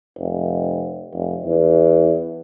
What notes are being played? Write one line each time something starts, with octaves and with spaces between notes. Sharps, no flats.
F1
F1
E2